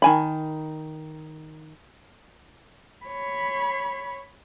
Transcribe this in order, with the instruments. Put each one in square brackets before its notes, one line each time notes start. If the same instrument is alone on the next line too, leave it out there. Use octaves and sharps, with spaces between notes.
[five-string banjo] D#3 G#5 B5
[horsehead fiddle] C#5 B5